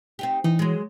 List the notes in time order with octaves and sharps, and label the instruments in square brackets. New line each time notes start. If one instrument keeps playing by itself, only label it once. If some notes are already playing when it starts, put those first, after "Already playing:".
[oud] C4 D#4 G4
[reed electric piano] E3 [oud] D#4
[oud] F#3 G#3